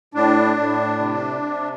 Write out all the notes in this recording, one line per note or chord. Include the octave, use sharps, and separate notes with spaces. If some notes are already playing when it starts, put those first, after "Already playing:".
A2 D4
A2
C3
C3